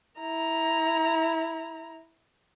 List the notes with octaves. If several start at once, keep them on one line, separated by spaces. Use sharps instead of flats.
E4 A#5